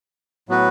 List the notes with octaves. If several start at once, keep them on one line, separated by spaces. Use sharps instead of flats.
A2 F#3 B3 F#4 B4